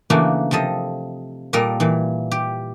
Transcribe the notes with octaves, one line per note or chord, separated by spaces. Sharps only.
C#3 E3 A3 A#3 D4 F#4
C3 F3 A4 D#5
A#2 G3 A4 A#4 D#5
A#2 E3
G4